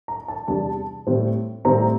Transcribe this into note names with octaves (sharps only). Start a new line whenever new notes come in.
A#5
A5
E2 C3 G3 D4 A5
A2 G3 C4
A2 G3 C4 A#5